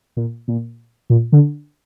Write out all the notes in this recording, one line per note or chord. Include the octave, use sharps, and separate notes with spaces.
A#2
A#2
A#2
D3